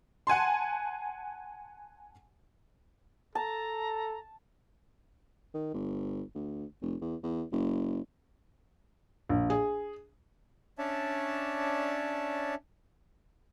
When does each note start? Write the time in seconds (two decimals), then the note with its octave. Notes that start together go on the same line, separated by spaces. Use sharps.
0.27 F#5 G#5 A5 C6
3.35 A4 A5 A#5
5.54 D#3
5.74 G1
6.35 D2
6.82 F1
7.01 E2
7.23 E2
7.52 F#1
9.29 A#1
9.50 G#4
10.78 C#4 D4 C#5 D5 E5 A5